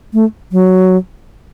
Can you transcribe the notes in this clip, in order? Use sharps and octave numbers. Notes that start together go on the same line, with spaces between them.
A3
F#3